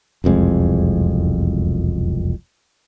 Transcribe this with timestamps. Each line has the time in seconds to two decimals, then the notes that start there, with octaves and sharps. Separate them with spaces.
0.24 E1 C2 F2 G#3